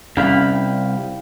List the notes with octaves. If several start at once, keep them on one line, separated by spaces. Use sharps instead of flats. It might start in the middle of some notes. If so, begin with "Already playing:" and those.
C2 C#4 F5 G5 B5